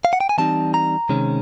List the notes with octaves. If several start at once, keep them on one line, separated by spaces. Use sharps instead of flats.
F5
F#5
G5
G#5
E3 G3 C4 D#4 A5
A#5
C3 D#3 G#3 C#4